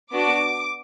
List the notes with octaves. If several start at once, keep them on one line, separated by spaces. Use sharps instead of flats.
B3 D4 F#4 D6